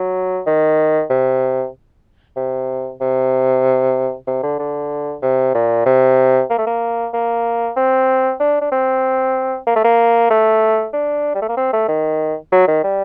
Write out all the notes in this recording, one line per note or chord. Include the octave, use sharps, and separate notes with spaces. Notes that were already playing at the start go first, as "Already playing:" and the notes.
Already playing: F#3
D#3
C3
C3
C3
C3
D3
D3
C3
A#2
C3
A#3
A3
A#3
A#3
C4
D4
D4
C4
A#3
A3
A#3
A3
D4
G3
A3
A#3
C4
A3
D#3
F#3
D#3
G3